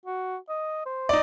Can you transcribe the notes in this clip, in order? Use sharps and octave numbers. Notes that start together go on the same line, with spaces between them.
F#4
D#5
C5
D#4 D5